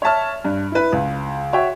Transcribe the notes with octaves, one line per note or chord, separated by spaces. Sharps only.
C#5 E5 A5 F6
G2
E4 B4
C#2
F#4 C#5 E5 G5